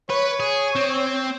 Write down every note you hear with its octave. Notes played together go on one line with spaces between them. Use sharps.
B4 C#5
G#4
C4